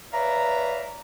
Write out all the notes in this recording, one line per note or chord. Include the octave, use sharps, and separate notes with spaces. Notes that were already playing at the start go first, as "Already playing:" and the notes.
B4 C#5 D5 E5 F5 A#5